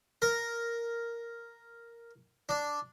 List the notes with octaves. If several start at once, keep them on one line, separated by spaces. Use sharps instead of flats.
A#4
D4